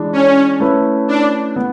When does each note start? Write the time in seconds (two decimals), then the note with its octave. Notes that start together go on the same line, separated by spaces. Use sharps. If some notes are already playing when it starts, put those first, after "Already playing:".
Already playing: E3 G#3 D4
0.13 C#4
0.60 A3 C#4 E4 B4
1.08 D4
1.56 B3